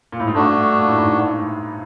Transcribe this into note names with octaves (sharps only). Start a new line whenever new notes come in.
A#2
A2
G#2
G2 A3 D4 F#4
A#2
A2
G#2
A2